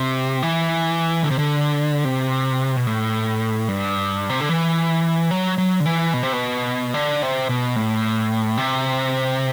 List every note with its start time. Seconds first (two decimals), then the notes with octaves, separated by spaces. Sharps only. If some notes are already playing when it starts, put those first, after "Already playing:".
Already playing: C3
0.42 E3
1.23 D3
1.30 C3
1.39 D3
2.05 C3
2.76 B2
2.87 A2
3.68 G2
4.29 C3
4.41 D3
4.49 E3
5.31 F#3
5.58 F#3
5.80 D3
5.86 E3
6.13 B2
6.23 C3
6.33 B2
6.94 D3
7.22 C3
7.49 B2
7.76 A2
8.57 C3